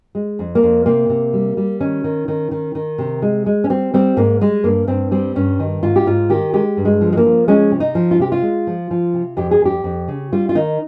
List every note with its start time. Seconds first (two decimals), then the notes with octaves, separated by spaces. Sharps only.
0.15 G#3
0.39 F2
0.55 A#3
0.63 F2
0.86 C3 A#3
1.09 C3
1.33 G3
1.57 G3
1.80 D#3 C#4
2.04 D#3
2.28 D#3
2.51 D#3
2.75 D#3
2.98 C3
3.22 G#3
3.46 G#3
3.64 C#4
3.70 G3 C4
3.94 G3 C4
4.17 G#2 A#3
4.41 G3 G#3
4.64 G2 A#3
4.87 G2 C4
5.11 G3 C4
5.35 G2 C#4
5.60 D#3
5.83 G#2 F4
5.96 G4
6.06 G#2 F4
6.30 D#3 G4
6.53 G#3 G4
6.77 G2
6.85 G#3
7.01 F3
7.12 G#3
7.17 A#3
7.25 F3
7.48 G#3 C#4
7.71 C3
7.80 D#4
7.95 F3
8.11 F4
8.19 C3 G4
8.32 F4
8.42 G#3
8.67 F3
8.91 F3
9.14 C3
9.37 F2 G4
9.51 G#4
9.61 F2 G4
9.84 F2
10.08 C#3
10.32 G3 F4
10.49 F4
10.55 D#3 D#4